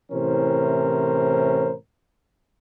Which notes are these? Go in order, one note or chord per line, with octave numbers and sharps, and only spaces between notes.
A2 C3 E3 C#4 A#4 C5